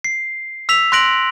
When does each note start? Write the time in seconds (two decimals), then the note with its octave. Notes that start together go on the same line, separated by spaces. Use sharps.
0.04 C7
0.69 E6 B6 F7
0.92 C6 F#6 A#6 D7 F#7